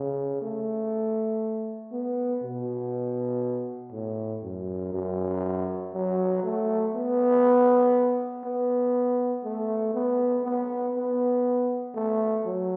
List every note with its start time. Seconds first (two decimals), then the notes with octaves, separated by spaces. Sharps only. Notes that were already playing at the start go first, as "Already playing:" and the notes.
Already playing: C#3
0.42 A3
1.92 B3
2.43 B2
3.92 A2
4.43 F#2
4.93 F#2
5.94 F#3
6.43 A3
6.94 B3
8.44 B3
9.44 A3
9.94 B3
10.44 B3
10.95 B3
11.95 A3
12.45 F#3